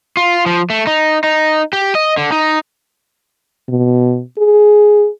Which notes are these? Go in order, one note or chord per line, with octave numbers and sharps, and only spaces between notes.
F4
F3
A3
D#4
D#4
G4
D#5
D3
D#4
B2
G#4